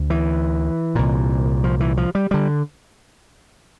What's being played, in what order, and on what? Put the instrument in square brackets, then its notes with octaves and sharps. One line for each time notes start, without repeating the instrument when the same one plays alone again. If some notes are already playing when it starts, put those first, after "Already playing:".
Already playing: [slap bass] D2
E3
C2 A#2
F3
E3
F3
G3
D3 G3